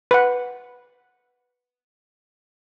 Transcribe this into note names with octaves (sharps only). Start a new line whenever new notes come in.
B4 F#5